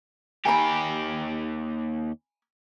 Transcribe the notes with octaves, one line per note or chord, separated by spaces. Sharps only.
D#2 G4 G#5 A#5 B5